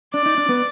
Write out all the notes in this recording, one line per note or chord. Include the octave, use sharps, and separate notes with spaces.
D4 D5
D#4
D4
B3